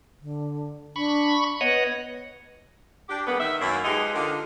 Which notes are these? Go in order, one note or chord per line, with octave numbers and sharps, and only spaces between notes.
D3
D4 B5 C#6
B3 C#5 D#5 F#5
D4 G4
C#3 G3 A#3 B3
D#3 E5
F#2 A#3 E5
F3 G#3 B3 D#4 G4 G#4
D3 D#3 F4